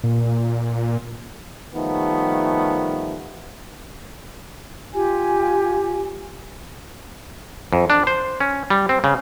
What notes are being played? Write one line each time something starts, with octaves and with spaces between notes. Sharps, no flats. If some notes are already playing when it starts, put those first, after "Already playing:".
A#2
D#3 F3 G3 A3 B3
F4 G4 G#5
F2
D4
C5
C#4
G3
C4
C#3